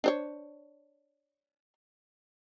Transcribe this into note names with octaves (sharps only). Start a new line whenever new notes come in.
D4 C5 C#5